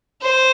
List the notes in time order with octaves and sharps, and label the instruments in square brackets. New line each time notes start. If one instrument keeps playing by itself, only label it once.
[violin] C5